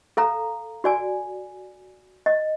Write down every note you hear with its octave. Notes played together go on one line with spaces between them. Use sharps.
A4 F5 A#5
F#4 D5 G#5
D#5